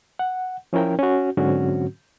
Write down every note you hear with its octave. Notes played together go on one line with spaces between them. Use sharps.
F#5
F3 C#4 E4 A#4 G5
C#4 F#4
G#2 D3 F#3 C4 C#4 F#4